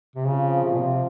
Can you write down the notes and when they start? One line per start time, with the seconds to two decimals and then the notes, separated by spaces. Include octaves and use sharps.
0.16 C3
0.25 C#3 F3 C4 F4
0.64 C3
0.72 A#2
0.80 C3